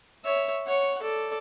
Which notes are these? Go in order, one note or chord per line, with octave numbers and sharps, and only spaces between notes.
C#5 E5
C#5 F#5
A4 D5